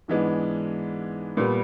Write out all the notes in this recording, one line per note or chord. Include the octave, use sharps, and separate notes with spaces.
G#2 E3 G#3 B3 D4
A#2 G3 B3